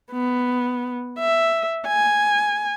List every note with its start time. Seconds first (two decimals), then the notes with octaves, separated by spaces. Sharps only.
0.12 B3
1.19 E5
1.87 G#5